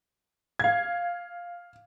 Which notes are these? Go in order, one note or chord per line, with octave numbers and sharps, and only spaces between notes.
F5 G#6